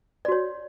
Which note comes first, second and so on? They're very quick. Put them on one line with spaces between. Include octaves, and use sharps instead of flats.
D5 F#4 C#5